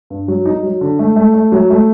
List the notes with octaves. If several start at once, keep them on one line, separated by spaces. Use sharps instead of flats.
G2
F#3
D#4
F#3
D3
A3
A3
A3
F#3
A3